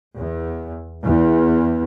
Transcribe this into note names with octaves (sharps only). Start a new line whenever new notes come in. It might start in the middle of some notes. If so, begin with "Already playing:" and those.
E2
E2